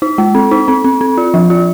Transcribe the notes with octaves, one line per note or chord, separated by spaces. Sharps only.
D#4
G#3
C4
D#4
C4
C4
C4
F4
F3
F4